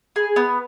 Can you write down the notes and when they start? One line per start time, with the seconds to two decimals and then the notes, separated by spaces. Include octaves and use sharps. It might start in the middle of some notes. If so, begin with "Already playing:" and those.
0.16 G#4
0.36 B3